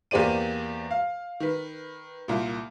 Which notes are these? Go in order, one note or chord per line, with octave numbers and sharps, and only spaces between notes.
E2 A#3 G4 C5 D5 D#7
F5
D#3 B4
C2 A#2